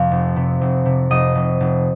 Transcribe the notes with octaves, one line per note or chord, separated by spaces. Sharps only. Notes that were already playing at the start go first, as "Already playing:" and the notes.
Already playing: F2 C3 F5
F1
C3
F1
C3
F1 D#5 D#6
F1
F1